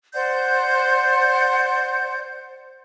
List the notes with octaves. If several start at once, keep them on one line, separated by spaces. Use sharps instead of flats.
C5 D5 F#5 G6